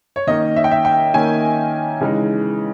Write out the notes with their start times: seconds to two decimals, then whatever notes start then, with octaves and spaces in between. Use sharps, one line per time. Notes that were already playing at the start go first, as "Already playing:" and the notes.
0.16 C#5
0.27 D#3 A#3 C#4 D#5
0.56 E5
0.64 G5
0.71 E5
0.85 G5
1.14 D#3 A#3 C#4 G#5
2.01 C#3 E3 G#3 D#4